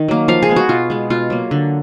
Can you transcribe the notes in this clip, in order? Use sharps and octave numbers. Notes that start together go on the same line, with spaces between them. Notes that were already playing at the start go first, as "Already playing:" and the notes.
Already playing: D#3
F#3 A#3
F3 F5
G#4
G#3 B3
F#4
B2 F4
G#3 B3
B2 F4
F#3 A#3
D3